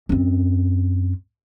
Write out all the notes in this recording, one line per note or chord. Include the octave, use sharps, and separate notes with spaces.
F#2 C4